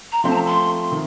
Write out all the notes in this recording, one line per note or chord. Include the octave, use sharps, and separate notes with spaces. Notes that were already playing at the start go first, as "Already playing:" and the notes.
A#5
F3 A3 C4 C6
A5
A#5
C6
D#3